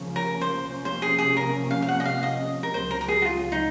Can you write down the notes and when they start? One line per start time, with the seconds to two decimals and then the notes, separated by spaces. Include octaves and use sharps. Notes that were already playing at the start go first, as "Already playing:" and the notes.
Already playing: C#2 C#3 F3 A#3 C#4
0.16 A#4
0.41 C5
0.68 C3 F3 A#3 C#4
0.85 C5
1.02 G#4
1.18 G#4
1.37 A#4
1.71 F5
1.82 F5
1.88 F#5
2.00 D#5
2.05 F5
2.23 D#5
2.63 A#4
2.74 C#2 C#3 F#3 C5
2.91 A#4
3.01 A#4
3.08 G#4
3.22 F#4
3.25 F4
3.52 D#4